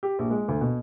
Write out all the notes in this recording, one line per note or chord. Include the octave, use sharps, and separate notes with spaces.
G4
A#1
G#3
D2
B2